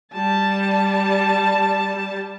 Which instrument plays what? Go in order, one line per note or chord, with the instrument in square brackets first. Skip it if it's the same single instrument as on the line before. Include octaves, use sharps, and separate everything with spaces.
[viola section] G3 A5